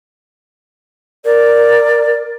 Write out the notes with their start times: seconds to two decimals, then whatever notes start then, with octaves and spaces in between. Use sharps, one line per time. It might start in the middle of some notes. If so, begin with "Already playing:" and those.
1.25 A#4 D5